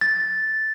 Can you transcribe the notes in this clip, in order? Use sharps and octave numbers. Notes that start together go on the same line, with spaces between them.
A6